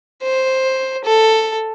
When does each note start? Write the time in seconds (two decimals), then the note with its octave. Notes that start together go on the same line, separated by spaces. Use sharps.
0.23 C5
1.05 A4